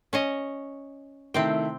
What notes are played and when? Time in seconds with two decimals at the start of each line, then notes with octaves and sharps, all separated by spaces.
0.13 C#4 C#5 D#5
1.34 C3 D#3 A3 C4 E4 G5